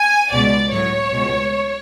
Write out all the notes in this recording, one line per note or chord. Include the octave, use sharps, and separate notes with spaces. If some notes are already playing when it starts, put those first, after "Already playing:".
Already playing: G#5
C#2 B2 G#3 D5
A2 F#3 A3 C#5
C#2 B2 G#3